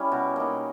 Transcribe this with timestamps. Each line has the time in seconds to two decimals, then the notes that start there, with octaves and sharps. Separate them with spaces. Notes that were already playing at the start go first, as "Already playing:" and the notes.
Already playing: G3 C#4 E4
0.12 B2
0.36 A#3 D#4